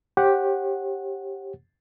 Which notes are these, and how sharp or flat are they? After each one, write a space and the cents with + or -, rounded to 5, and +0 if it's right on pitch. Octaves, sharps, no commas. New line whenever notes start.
G4 +0 C#5 -45 F#5 -5